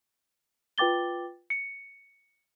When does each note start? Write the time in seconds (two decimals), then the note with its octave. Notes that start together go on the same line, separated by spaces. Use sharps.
0.78 F4 B4 G5 D6 A6 G7
1.50 C#7